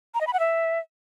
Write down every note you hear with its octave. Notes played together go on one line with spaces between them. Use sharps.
A#5
D#5
B5
F#5
E5